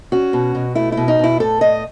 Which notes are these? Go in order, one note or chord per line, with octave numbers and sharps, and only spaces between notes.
C#4 F#4
B2
B2
A3 E4
E4
B2
D#4
B2 E4
A2 A4
A2 D#5